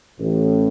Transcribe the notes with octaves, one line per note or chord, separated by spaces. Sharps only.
A1 A2